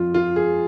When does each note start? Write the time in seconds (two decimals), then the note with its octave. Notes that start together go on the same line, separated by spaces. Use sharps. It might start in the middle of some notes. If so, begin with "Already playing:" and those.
Already playing: F2 F3 F4
0.14 F4
0.36 G#4